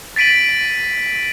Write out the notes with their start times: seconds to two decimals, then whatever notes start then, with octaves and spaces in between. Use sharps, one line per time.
0.16 A6 B6 D7 D#7 F#7